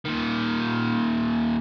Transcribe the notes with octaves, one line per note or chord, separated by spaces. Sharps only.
A#2 D#3